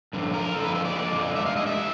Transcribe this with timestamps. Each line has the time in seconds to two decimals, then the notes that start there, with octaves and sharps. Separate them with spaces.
0.13 G2 D3 F3
0.34 A#4
0.54 F2 D3 F3 A4
0.65 B4
0.75 C5
0.85 D5
0.95 F2 D3 F3 G#3
1.36 G2 E3 G#3 E5
1.46 F5
1.57 D#5
1.67 E5
1.77 E3 G#3